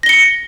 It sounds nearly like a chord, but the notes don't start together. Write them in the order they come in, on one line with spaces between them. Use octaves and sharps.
A#6 G7 C#7